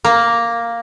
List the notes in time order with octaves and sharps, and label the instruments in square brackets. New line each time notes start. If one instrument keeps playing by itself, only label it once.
[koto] A#3